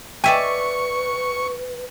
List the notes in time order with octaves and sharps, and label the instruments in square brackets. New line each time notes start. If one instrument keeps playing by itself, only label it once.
[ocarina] B4 [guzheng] D5 E5 G#5 [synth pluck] G5 [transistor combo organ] C#6